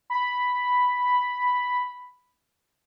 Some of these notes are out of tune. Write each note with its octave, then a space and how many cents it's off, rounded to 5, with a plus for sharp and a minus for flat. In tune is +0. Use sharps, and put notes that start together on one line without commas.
B5 +0